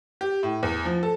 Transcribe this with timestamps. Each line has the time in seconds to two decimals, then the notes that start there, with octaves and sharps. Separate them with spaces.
0.21 G4
0.43 A2
0.63 E2
0.85 F3
1.03 A4